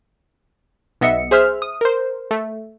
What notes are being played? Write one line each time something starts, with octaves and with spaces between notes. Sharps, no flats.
B1 B3 D#5 E5 C#7
G#4 C5 E5 F6
D#6
A#4 C5
A3